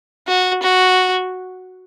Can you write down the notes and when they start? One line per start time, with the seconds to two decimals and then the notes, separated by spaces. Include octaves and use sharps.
0.28 F#4
0.63 F#4